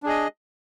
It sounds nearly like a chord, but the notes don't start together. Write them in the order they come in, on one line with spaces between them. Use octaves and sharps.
D4 G#4 D#5